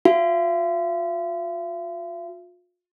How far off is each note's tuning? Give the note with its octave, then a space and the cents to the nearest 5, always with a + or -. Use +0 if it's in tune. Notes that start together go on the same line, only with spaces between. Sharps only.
F4 +40 E5 +45